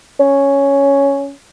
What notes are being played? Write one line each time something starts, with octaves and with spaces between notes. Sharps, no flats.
C#4